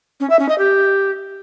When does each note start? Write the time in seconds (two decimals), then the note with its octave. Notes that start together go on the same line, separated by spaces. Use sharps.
0.20 C#4
0.30 E5
0.39 C#4
0.49 D#5
0.58 G4